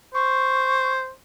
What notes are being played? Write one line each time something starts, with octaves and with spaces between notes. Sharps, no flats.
C5 C#6